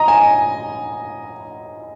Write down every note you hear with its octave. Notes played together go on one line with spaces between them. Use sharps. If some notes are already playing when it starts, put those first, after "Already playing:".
Already playing: D#5 A#5
G#5